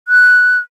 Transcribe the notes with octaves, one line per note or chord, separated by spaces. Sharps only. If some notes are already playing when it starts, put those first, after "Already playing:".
F#6